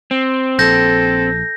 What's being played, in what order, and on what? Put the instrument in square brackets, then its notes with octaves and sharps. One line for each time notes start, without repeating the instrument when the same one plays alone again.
[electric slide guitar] C4
[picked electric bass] A#1 [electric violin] A4 [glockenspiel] G6 A#6